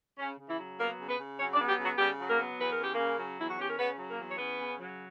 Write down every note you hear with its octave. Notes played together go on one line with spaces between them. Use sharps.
C#3 C#4
C#3
E3 E4
F#3
A#3 B3 A#4
C#3
B3 B4
C#3
F#3 C#4 C#5
D4 D5
B3
G3 G4
C#3
F#3 F#4
C#3 G3 G4
F#3
A#3 A#4
B3
E2 B4
A#4
C#4 G4
C#3 A#3 A#4
F#3
E2 E4
F#4
C#4 G4
A#4
C#3 B3 B4
F#3
A#3 A#4
E2
C#5
B3 C#4 B4
C#3
F#3